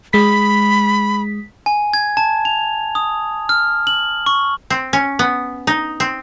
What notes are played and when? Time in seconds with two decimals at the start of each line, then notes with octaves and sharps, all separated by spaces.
0.13 G#3 B5 B6
1.66 G#5
1.94 G#6
2.17 A5
2.45 F7
2.95 D#6
3.49 F6
3.87 F#7
4.26 C#6
4.70 C4
4.93 C#4
5.19 B3
5.67 D#4
6.00 C4